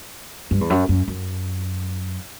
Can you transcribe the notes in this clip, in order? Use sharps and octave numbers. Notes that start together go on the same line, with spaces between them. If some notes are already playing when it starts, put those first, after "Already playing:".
G2
E2
F#2
F#2
F#2